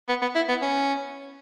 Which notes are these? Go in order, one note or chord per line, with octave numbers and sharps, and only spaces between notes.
B3
B3
E4
B3
C#4